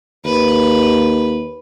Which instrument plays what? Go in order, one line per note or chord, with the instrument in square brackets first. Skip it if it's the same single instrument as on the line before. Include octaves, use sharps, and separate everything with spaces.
[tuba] D#2 [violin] B4